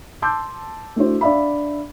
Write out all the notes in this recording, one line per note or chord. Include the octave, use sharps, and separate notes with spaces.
A5 C6 D6 E6 G6
A3 D4 E4 F#4 C5
D4 D5 E5 F5 B5